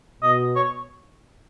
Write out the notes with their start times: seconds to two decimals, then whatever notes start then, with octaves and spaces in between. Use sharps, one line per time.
0.22 B2 D#5
0.56 C#5